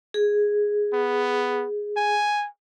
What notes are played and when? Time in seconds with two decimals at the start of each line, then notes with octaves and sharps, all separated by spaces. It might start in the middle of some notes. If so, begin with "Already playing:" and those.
0.14 G#4
0.93 B3
1.97 G#5